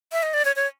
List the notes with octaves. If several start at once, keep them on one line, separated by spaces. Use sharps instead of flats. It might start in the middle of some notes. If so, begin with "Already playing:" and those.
E5
D#5
D5
C#5
C#5